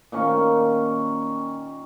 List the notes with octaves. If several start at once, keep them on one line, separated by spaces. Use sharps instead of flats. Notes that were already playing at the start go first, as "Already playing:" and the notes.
A#2 D#3 C#4 C#6